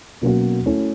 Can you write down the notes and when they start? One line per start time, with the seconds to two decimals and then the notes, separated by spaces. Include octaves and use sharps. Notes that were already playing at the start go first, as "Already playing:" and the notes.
0.21 B2 F#3 A#3 C#4 F#4
0.66 A3 C#4 E4 A4